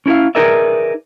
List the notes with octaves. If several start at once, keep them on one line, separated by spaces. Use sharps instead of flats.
C#4 E4 G4 E5 F5
D#4 G#4 A#4 B4 D5 E5